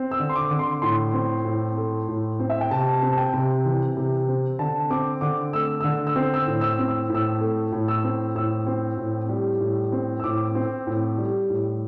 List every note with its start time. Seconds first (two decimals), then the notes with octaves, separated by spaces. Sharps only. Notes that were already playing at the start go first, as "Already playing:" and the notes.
Already playing: C4
0.11 E6
0.20 D3
0.29 C6
0.36 D6
0.51 D3
0.59 C6
0.82 A2 C6
1.13 C4
1.45 A2
1.77 A3
2.08 A2
2.40 C4
2.50 E5
2.61 G5
2.71 C3 A5
3.02 C4
3.11 A5
3.17 G5
3.34 C3
3.65 E3
3.97 C3
4.28 C4
4.59 D3 A5
4.90 C4 D6
5.21 D3 D6
5.53 A3 E6
5.81 D3 E6
6.07 E6
6.16 C4
6.34 E6
6.47 A2
6.61 E6
6.79 C4
6.88 E6
7.09 A2
7.15 E6
7.41 A3
7.72 A2
7.88 E6
8.04 C4
8.35 A2 E6
8.67 C4
8.98 A2
9.29 G3
9.61 A2
9.92 C4
10.20 E6
10.24 A2 D6
10.55 C4
10.87 A2
11.18 G3
11.50 A2